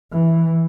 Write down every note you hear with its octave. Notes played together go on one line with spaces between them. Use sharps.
E3